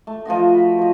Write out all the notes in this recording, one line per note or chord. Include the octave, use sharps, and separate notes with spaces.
A3
F3 F4 F#4 D#5
B5
F3 D#5